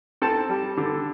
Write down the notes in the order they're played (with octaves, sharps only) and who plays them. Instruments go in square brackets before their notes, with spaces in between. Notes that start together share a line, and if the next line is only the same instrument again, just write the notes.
[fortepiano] C4 A4 A5
G3
D3